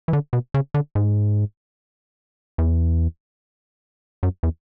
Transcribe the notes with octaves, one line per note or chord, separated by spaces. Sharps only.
E3
D3
B2
C#3
D3
G#2
E2
F#2
E2